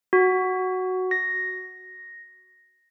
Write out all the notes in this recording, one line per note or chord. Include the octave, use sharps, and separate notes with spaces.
F#4
A#6